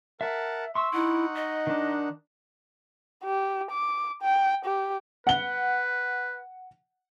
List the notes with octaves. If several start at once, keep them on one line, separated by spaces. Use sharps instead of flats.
A#4 E5 F#5 A5
E5 C6 C#6 E6
D#4 E4 F#5
D#5
D#3 D4
G4
D6
G5
G4
B4 F#5 G7